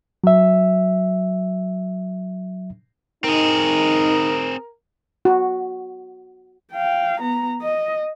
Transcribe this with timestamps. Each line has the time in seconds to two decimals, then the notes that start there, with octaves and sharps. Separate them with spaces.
0.24 F#3 E5
3.24 C4 D#4 G#4 A#4
5.25 F#4
6.73 F5 G5
7.21 B3 A#5
7.62 D#5